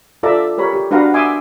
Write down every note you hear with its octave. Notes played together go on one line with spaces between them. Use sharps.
F4 A4 D5 E5 A#5
G4 A#4 C#5 B5
G4
D4 F#4 B4 F5 F#5 A#5
E5 G#5 C6 D6 D#6